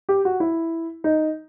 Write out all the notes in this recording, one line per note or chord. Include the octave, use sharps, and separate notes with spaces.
G4
F#4
E4
D#4